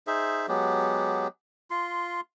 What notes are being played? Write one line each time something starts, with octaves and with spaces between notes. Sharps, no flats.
D#4 G#4 C5 E5
F#3 G#3 B3 G4
F4 C6